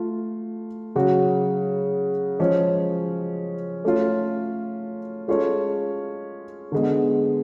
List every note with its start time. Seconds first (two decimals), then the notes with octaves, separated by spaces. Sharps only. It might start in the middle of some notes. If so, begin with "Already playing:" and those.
Already playing: A3 F4
0.95 C#3 F#3 C#4 F#4
2.39 F3 G#3 C#4 G#4
3.84 A3 C#4 F4
5.28 G#3 C#4 F4 A4 C#5
6.72 D3 G#3 B3